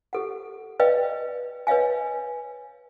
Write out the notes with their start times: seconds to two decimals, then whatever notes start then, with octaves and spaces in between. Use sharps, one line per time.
0.13 G4 A4 F#5
0.80 B4 D5 D#5 F5 G5
1.67 B4 C#5 D#5 F5 G#5